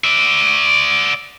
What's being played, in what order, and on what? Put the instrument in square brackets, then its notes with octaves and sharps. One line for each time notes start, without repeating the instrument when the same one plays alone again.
[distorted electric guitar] D5 E5